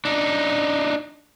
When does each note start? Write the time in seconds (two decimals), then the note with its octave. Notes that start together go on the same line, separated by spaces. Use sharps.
0.05 D4 D#4